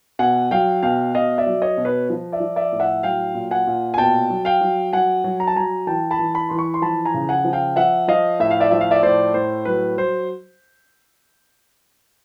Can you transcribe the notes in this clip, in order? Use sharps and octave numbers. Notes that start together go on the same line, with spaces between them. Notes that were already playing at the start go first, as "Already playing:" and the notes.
B2 F#5 G#5
F#3 F5 G5
B2 F5 G5
B2 D#5 F5
D5 E5
F#3
C#5 D#5
B2
B4 C#5
F3
D5 E5
F3
D5 E5
A2
E5 F#5
F#3 F5 G5
A#2
F#5 G#5
A#2
G#5
B2 G5 A5
F#3
F5 G5
F#3
F#3 F#5 G#5
F#3
A#5
A5
F#3 G#5 A#5
E3 G5 A5
A5 B5
E3
A5 B5
E3 C6
B5 C#6
C6
F3 A5 B5
G#5 A#5
C#3
F#5 G#5
F3
F5 G5
F3 E5 F#5
F3 D#5 F5
A2 E5
F5
D5 E5
F3 E5
F5
D5 E5
A2 C5 D5
A2 C5
F#3 B4
F#3 C5